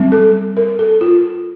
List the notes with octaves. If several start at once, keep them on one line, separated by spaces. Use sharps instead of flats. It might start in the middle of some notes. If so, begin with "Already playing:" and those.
Already playing: G3 C4
A4
A#4
A4
F4